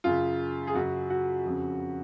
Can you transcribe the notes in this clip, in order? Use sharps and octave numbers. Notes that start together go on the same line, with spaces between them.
F#2 C#3 F4
G#4
F#2 C#3 F#4
F#4
F2 C#3